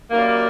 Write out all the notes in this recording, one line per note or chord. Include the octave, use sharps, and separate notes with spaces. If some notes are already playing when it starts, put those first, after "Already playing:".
F#2 D#3 G3 A#3